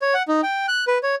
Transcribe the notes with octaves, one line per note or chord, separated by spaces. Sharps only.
C#5
F#5
D#4
G5
F#6
B4
C#5